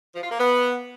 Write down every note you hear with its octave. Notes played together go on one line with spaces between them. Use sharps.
F3
F4
A#3
B3